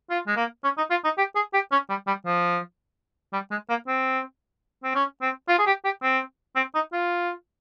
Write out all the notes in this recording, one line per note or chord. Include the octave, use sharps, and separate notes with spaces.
F4
G#3
A#3
C#4
D#4
F4
D#4
G4
G#4
G4
C#4
G3
G3
F3
G3
G#3
A#3
C4
C4
C#4
C4
F4
G#4
G4
G4
C4
C4
D#4
F4